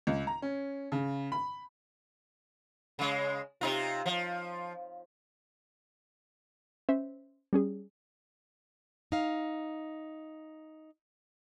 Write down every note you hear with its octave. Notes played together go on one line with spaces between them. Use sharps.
C#2
A#5
C#4
C#3
B5
C#3 G#3
C3 D#4 F4
F3
C#4 C5 E5
G3 C#4 G#4
D#4 F5